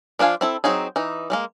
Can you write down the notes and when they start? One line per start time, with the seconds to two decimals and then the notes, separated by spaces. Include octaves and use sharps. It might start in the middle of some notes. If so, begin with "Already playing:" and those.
0.19 F3 D4 F4 F5 G#5
0.41 C4 E4 A4
0.64 F#3 C4 D#4 G#4
0.96 E3 D#4
1.30 G3 G#3 A#3